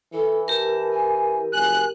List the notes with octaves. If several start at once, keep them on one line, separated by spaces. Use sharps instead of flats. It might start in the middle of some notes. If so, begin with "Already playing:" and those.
E3 A4
G4 A#4 A5
G#5
F#1 G#5 F#6